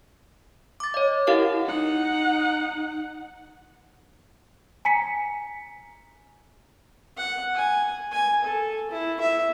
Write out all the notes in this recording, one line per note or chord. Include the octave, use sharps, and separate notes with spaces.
D6 A6
C#5 D#5
E4 G4 A#4 F5 F#5
D#4 F#5
G#5 A#5 B6 C#7
F#5
G#5
G#5
A4
E4
E5